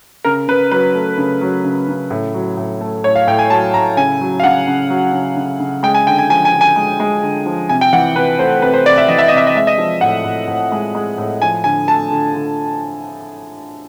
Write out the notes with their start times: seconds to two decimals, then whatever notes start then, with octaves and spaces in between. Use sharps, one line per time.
0.25 C#3 A#4
0.48 C#3 B4
0.71 F#3 B4
0.95 A3
1.17 C#3
1.41 F#3
1.64 C#3
1.88 C#3
2.11 A2
2.34 F#3
2.57 A2
2.81 A3
3.04 A2 C#5
3.16 F5
3.27 A2 G5
3.39 G#5
3.50 F#3 A5
3.74 A2 A#5
3.97 C#3 G#5
4.21 F#3
4.40 F5
4.44 C#3 F#5
4.67 C#3
4.90 F#3
5.13 C#3
5.36 C#3
5.60 C#3
5.83 G#3 G5
5.94 G#5
6.07 D3 G5
6.18 G#5
6.30 F3 G#5
6.45 G#5
6.53 D3
6.61 G#5
6.76 G#3
7.00 G#3
7.23 D3
7.46 F3
7.69 C3 G#5
7.81 G5
7.93 E3 F#5
8.15 C3 B4
8.39 A3 C5
8.62 C3 B4
8.74 C5
8.85 C3 D5
8.98 E5
9.08 E3 D#5
9.18 E5
9.28 C3 D#5
9.37 E5
9.47 D#5
9.55 G#3 E5
9.67 D#5
9.78 F3
10.01 A2 F#5
10.25 A2
10.48 A2
10.72 G#3
10.95 G#3
11.18 A2
11.42 F3 G#5
11.64 D3 G#5
11.87 A3 A5
12.10 D3
12.34 D3